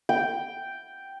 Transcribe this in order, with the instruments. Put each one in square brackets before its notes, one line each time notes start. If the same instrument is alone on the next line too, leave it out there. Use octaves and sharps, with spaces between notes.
[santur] G5